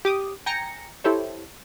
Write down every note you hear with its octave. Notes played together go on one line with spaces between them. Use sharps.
G4 D6 D#6
G5 G#5 A#5 A#6 C#7
E4 G4 A4 C5 C#5